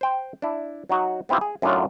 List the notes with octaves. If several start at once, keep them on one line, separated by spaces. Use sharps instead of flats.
C5 G5
D4 E4
F#3 D#4 F#4
B3 C4 E4 F4 G4
G#4
F#2 A2 F#3 D4 D#4 F4